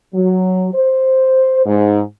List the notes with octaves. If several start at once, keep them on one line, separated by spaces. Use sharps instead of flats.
F#3
C5
G#2